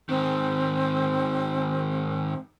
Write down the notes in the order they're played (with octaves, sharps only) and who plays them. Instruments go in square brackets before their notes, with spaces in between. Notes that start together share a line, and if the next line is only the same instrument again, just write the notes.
[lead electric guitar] G#2 D#3 [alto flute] C4